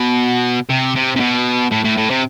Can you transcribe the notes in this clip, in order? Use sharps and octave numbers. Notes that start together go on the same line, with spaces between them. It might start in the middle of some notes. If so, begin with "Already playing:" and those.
Already playing: B2
C3
C3
C3
B2
A2
A2
A2
C3